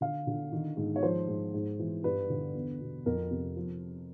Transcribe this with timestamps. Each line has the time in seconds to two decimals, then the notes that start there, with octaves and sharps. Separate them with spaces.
0.01 D3 F5
0.27 D3
0.52 D#3
0.77 G#2
0.96 C#5
1.03 F3 C5
1.28 G#2
1.54 G#2
1.79 E3
2.04 G2 B4
2.30 D3
2.54 E2
2.80 B2
3.06 F2 A#4
3.31 C3
3.56 F3